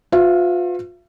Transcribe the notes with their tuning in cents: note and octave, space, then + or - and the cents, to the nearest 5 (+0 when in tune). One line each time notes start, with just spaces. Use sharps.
F4 +35 B4 +35 E5 +45